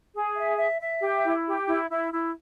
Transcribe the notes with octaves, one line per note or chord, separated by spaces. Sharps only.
G#4
E5
E5
E5
G4
E4
G4
E4
E4
E4